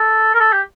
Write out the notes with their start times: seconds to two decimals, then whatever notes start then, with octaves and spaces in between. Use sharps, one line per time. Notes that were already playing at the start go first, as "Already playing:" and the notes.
Already playing: A4
0.34 A#4
0.40 A4
0.53 G4